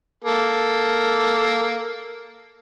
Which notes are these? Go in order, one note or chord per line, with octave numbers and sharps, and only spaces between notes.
A#3 A4